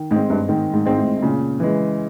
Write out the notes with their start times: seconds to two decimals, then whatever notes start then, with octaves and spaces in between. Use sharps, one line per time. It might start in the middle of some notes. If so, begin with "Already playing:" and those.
Already playing: D#3
0.11 G#2 G#3 C4
0.30 G2
0.48 G#2 D#3
0.73 G#2
0.85 G#2 G#3 C4
0.98 A2
1.16 A2
1.22 A#2 C#3
1.60 E3 G#3